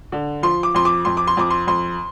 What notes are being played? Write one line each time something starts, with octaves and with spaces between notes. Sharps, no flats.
D3
F3 C6
D6
F2 C6
D6
F2 C6
D6
C6
F2 D6
C6
F2 C6